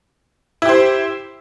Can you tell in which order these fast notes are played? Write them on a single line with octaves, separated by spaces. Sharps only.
E4 G4 C5